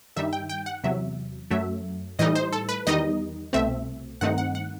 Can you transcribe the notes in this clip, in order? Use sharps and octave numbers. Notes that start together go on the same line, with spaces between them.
G2 D#3 G3 D#4 E5
G5
G5
F#5
E2 C3 F#3 E5
F#2 F#3 A3 E5
A2 E3 G3 D#4 D#5
C5
A4
B4
E2 D#3 G3 D#4 D#5
C2 B2 A3 C4 E5
G2 D#3 A3 C4 D#4 F#5
F#5
F#5